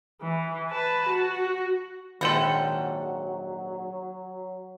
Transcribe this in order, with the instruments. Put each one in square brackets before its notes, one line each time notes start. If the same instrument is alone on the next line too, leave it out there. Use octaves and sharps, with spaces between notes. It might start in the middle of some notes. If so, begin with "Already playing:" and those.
[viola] E3
B4 A5
F#4
[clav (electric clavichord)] A#1 G#2 A4 [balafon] D#3 C6 [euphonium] F#3 [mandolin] F#5 G5